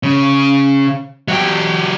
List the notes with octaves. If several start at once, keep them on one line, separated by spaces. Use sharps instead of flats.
C#3
F#3 G4